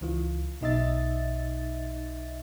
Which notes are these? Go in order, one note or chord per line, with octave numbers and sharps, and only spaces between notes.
C#2 E3 F4
B1 B2 D#4 D#5 E5 A6